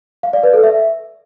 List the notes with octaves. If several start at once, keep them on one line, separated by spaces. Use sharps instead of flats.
F5
D5
B4
A4
E5